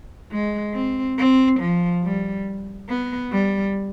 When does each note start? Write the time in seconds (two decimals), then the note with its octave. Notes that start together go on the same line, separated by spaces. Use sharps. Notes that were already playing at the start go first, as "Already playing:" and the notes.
0.32 G#3
0.74 C4
1.18 C4
1.60 F3
2.04 G3
2.89 B3
3.32 G3